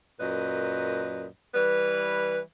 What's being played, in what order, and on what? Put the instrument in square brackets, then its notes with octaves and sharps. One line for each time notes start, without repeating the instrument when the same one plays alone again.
[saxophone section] F#2 A#2 B4 D#5
E3 G3 B4